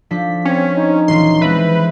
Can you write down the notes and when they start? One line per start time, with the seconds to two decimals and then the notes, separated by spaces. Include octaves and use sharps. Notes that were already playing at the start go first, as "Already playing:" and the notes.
0.11 F3 D4 A4 B6
0.45 C4 C#4
0.77 D#4 C5
1.08 D#1 E3 C#4 C6
1.42 G#3 C4 B4 E5